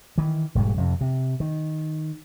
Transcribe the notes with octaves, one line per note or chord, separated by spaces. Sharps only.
D#3 E3
E1 G#2 G3
F2 C3
C3
D#3